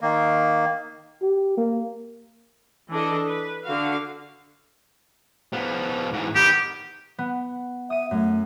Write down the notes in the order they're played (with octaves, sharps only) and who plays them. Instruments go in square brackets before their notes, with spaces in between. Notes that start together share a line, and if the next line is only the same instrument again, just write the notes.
[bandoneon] D#3 A#3
[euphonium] G4
A#3
[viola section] E3 D4 A4 D#5
B4
D3 F#4 F5
[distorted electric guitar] F3 B3
G#2 E3
[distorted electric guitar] D#3 B3 [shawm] G4
[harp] B3
[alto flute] E5 [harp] D#6 D#7
[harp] F#2 [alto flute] A3